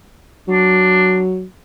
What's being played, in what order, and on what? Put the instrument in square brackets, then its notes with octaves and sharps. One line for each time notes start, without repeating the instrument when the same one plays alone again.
[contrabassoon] F#3 [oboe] D4